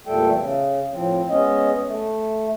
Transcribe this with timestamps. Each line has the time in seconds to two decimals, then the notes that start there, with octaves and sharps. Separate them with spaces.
0.07 E2 A#2 G3 A3 A4 G5
0.38 C#3
0.93 A2 F3 C4
1.29 G#3 B3 C#4 D#5
1.87 A3